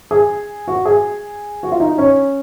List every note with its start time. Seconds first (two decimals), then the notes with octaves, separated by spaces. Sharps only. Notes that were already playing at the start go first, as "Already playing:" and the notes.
0.11 G#4
0.68 F#4
0.85 G#4
1.63 F#4
1.72 F4
1.80 D#4
1.98 C#4